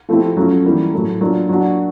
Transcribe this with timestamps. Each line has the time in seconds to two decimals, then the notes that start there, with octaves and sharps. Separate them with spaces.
0.09 F3 A3 C4 E4 G4
0.37 F#3 A3 C#4 F4
0.64 E3 G3 A#3
0.93 A2 F#3 A3
1.21 F#3 A#3 D4 F4
1.49 F#3 A#3 D4 F#4